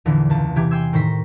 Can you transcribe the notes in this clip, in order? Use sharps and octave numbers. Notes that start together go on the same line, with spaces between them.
A#1 E2 D3 E3
C#2 A5
C3 E3 G4 G#6
G5 G#5 C6 E6 G#6
A2 D#3 C5 C#6 A#6 B6